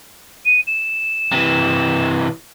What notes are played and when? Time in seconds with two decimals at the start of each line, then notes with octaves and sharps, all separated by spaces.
0.45 D#7
0.67 E7
1.32 C3 E3